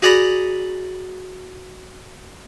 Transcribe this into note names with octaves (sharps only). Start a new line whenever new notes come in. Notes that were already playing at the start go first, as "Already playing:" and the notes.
F#4 G#4 D5 F#5 A#5 B5